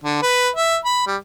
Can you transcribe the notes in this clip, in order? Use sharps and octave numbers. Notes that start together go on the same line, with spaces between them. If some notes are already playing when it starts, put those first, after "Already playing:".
D3
B4
E5
B5
G3